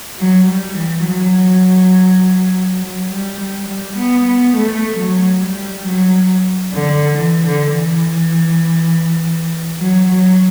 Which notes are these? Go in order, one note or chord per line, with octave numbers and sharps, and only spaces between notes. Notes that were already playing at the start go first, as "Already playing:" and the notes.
F#3
G3
E3
F#3
F#3
G3
G3
G3
B3
B3
A3
F#3
G3
F#3
D3
E3
D3
E3
F#3
F#3